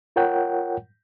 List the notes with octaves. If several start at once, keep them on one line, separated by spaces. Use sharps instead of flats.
F4 A#4 C#5 F#5 G5